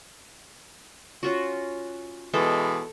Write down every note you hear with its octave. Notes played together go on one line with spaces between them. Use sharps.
C#4 F4 F#4
B2 E3 G#3 A4